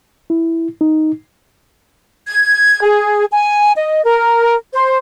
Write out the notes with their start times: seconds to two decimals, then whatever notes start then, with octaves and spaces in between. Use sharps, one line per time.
0.30 E4
0.81 D#4
2.27 G#6
2.82 G#4
3.31 G#5
3.76 D#5
4.04 A#4
4.73 C5